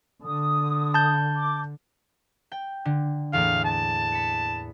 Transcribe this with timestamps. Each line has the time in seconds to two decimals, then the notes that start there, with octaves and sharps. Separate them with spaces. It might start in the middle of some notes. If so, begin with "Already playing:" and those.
0.23 D3 D#6
0.94 A5 G6
1.36 D6
2.52 G5
2.85 D3
3.33 E2 A2 A#3 F5
3.65 A5
4.12 B5 C#7